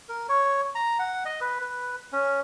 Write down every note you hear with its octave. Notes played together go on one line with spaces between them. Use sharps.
A#4
C#5
A#5
F#5
D#5
B4
B4
C#4